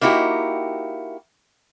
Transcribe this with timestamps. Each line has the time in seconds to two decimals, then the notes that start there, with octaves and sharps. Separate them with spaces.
0.01 A#3 D#4 E4 F#4 G4